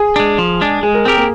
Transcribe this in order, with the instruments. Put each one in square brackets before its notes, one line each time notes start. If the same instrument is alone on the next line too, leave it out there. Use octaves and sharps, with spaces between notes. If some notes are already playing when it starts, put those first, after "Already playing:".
Already playing: [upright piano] G#4
[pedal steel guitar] G#3 D4
F3
G#3 D4
[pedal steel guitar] G#3 [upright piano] G#4
[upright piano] A#4
[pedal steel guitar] C4 G4 A#4 [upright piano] G#4
[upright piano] A#3